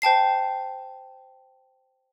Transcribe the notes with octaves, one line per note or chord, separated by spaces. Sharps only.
C5 G5 A5 C7